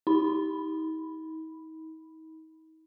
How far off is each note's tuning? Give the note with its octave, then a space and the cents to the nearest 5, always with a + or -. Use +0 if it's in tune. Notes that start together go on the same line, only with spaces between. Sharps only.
D#4 +40 B5 +0